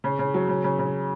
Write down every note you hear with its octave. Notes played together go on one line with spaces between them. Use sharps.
C#3
C#3
F#3
C#3
C#3
C#3